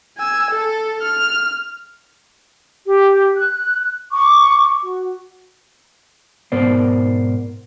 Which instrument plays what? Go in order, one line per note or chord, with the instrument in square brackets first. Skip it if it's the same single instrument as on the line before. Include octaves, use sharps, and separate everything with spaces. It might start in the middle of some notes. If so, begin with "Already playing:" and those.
[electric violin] G#5 E6
A4
F6
[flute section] G4
F#6
C#6 D6
F#4
[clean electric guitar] B1 G#2 B3 A#4 C5 D5